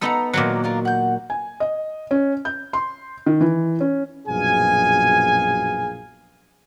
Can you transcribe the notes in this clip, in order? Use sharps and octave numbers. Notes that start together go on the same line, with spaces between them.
B3 D#4 A4 A#5 C6 E6
A#2 D#3 F#3 A#3 F#6
D4 F4 A#4
F#5 G6
G#5
D#5
C#4
G6
C6
D#3
E3
C#4
A#1 F#2 B2 G#4 F5 G#5